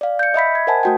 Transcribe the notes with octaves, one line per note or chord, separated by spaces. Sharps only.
D5 F5
G6 C#7
D#5 E5 B5 B6
G#6
A#4 C5 D#5 F#5 G#5 A5
A3 F#4 G5